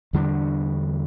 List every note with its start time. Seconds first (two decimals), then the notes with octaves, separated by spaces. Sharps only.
0.13 E2 D3 G3 D4